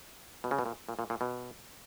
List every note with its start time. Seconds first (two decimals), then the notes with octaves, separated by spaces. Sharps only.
0.44 B2
0.51 C#3
0.59 B2
0.66 A#2
0.89 A#2
0.99 A#2
1.10 A#2
1.21 B2